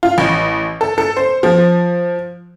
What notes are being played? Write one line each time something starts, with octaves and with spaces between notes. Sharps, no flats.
F4
A1
A4
A4
C5
F3